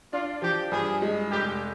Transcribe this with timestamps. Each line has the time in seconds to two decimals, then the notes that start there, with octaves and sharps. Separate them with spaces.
0.13 D4 F4
0.42 F3 G4
0.72 G2 G#4
1.02 G#3
1.31 F1 G4